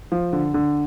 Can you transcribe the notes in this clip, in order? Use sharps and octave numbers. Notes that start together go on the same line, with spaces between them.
F3
D3
D3